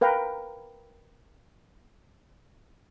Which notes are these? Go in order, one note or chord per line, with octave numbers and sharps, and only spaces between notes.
A#4 B4 F5 G5 A#5